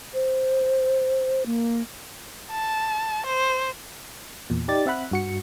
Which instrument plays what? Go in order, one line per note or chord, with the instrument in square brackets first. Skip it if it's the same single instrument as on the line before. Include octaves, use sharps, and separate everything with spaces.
[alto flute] C5
A#3
[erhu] A5
C5
[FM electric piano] E2 A#2
D#4 G4 D5 A6
C4 E5 F#5 B5 F#6
G2 F#4 C#7